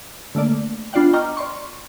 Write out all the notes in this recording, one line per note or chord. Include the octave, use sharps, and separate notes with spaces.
D3 A3 A#3 D5
B3 D4 F4 D5 F#5 G5
D#5 G5 A#5 C#6 D6 F6
D5 C6 C#6